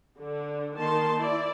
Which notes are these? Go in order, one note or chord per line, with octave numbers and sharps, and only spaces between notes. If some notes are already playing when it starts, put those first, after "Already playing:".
D3
D#3 A#3 A5 C6
E4 D5